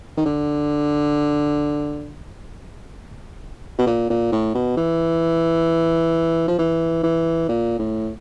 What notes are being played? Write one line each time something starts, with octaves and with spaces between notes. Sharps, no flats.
D#3
D3
B2
A#2
A#2
A2
B2
E3
F3
E3
E3
A#2
A2